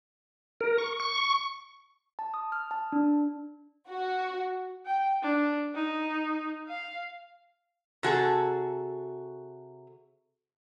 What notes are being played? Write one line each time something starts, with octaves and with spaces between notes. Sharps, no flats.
A#4
C#6
C#6
A5
D#6
F6
A5
D4
F#4
G5
D4
D#4
F5
C3 F#4 G#4 A4